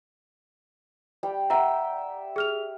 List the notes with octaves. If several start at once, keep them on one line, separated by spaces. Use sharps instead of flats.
G3 G5
E5 F#5 G5 A#5
G#4 F6 F7